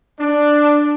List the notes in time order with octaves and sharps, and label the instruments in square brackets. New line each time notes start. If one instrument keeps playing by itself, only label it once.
[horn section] D4